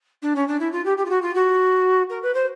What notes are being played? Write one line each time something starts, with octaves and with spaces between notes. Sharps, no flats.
D4
C#4
D4
E4
F4
G4
G4
F4
F#4
F4
F#4
A#4
B4
C5